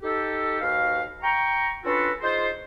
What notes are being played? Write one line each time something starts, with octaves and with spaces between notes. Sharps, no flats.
D#4 G4 A4
D#2 F#4 B4 F5
G5 A#5 C#6
C#4 D4 F4 F#4 A4 B4
D#4 F4 G#4 C5